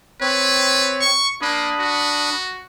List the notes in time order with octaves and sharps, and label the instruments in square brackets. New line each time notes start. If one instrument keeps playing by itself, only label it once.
[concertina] C4 C#5 [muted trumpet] B4
[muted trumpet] C#6
[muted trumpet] A#3 [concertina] D4 B5 D#6
[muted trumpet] F#4